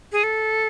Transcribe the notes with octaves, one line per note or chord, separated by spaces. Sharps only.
G#4
A4